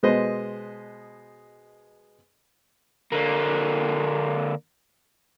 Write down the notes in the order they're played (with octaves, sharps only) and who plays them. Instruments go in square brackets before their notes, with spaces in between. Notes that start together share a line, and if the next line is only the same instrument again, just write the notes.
[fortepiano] B2 G#3 B4 C5 D#5
[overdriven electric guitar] D3 A#3